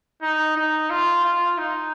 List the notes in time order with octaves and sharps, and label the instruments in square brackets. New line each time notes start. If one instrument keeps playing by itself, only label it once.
[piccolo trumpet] D#4
D#4
F4
F4
D#4